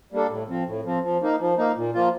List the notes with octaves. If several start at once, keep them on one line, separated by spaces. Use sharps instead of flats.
G3 A#3 D4 A4
A2
F3 C4
A2
F3 C4
F3
A#3 D#4
F3
A#3 D#4
A#2
F3 A#3 F4